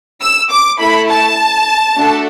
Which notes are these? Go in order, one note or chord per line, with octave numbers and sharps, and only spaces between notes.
E6
D6
A3 E4 A4 B5
A5
A3 D4 F#4 A4